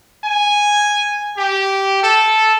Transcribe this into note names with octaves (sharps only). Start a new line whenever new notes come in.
G#5
G4
A4